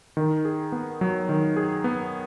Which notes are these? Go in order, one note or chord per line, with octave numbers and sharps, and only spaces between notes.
D#3
G#4
B3
F#3
D#3
G#4
B3